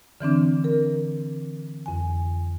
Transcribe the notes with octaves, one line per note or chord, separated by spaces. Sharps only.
D3 E3 C4 D4
A#4
F2 G#5